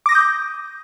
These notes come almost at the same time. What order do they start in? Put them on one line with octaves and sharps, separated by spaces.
D6 A#6 D#6 G6